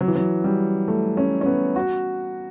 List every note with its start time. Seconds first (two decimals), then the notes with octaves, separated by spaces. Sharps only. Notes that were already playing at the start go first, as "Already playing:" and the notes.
0.01 F#3
0.08 E3
0.15 F#3
0.44 G3
0.88 A3
1.17 C#4
1.41 C#4
1.46 B3
1.76 F#4